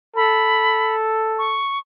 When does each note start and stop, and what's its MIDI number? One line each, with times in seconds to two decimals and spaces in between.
0.16 1.61 69
0.16 0.94 83
1.38 1.79 85